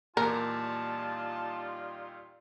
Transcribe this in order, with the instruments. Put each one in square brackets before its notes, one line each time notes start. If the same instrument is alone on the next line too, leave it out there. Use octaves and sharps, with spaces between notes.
[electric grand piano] E2 A#2 [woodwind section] G3 D#4 F4 [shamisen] A#4 [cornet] A5